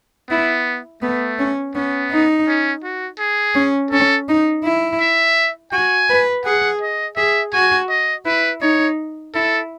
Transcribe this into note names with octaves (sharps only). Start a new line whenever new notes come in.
B3 E4
A3 B3
C#4
B3 C#4
D#4
C#4
F#4
G#4
C#4
C#4 A4
D#4
E4
E5
F#4 G#5
B4
G#4 F#5
D#5
G#4 E5
F#4 G#5
D#5
E4 B4
D#4 C#5
E4 A4